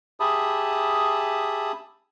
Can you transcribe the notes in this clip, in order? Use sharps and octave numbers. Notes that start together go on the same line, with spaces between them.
G4 G#4 E5 A5 B5 D#6